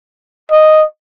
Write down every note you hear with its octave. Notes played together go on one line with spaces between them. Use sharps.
D#5